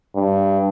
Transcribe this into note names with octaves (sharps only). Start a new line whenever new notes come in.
G2